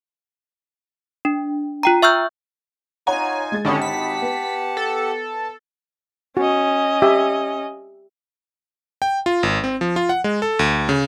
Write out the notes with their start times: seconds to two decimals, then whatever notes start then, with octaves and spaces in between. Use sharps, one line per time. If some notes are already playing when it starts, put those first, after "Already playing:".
1.25 D4
1.83 F4 G5 A#5
2.02 E5 C#6 E6 F6 G6
3.07 D#4 F4 C#5 F#5 G#5 A#5
3.52 G#3 A6
3.65 G#1 D3 C#4 G4 F#5 A5 B5 D#6
3.82 B6
4.22 B3
4.77 A4
6.37 C#4 F#4 D#5
7.02 G4 E5
9.02 G5
9.26 F4
9.43 G#1
9.64 C4
9.81 F3
9.96 F4
10.09 F#5
10.24 G#3
10.42 A4
10.59 D2
10.89 C#3